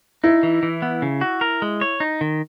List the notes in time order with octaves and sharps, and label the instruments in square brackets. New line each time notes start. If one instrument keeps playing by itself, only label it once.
[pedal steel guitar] D#4 [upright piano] E4
[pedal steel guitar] E3
E3
B3
C#3
F#4
A#4
G#3
C#5
D#4
D#3